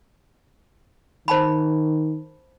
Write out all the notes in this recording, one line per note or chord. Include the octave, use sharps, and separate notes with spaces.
D#3 C5 A5 B5